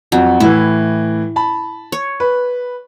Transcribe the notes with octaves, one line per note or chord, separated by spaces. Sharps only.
F2 F#3
A2 E3 E4
A5 B5
C#5
B4